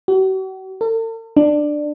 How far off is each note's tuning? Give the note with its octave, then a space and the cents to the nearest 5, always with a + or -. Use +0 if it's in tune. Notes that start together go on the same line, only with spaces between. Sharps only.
F#4 +45
A4 +45
D4 +15